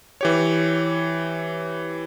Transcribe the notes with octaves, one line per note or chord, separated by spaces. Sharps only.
E3 G4 C#5